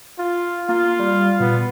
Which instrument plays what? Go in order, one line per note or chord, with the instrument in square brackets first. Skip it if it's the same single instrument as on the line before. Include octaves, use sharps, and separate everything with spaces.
[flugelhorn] F4
[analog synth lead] A#3 [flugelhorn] F4
[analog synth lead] G3
[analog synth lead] A#2 [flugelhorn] B3